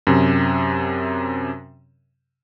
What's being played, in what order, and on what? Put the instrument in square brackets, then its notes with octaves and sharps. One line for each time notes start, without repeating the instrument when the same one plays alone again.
[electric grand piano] F#2 C3